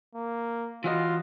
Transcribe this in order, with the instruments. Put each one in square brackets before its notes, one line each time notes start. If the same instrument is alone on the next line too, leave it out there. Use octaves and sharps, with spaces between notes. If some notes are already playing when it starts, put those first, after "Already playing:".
[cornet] A#3
[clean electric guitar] E3 F#4 D#5 [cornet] F4